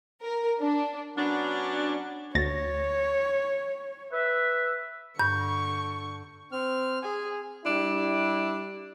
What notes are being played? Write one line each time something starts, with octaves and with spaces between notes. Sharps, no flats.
A#4
D4
F#3 B3 C#4 D4
D2 C#5 A6 A#6
B4 E5
G2 D3 C#6 G6
C4 F6
G#4 G#5
G3 D4 E4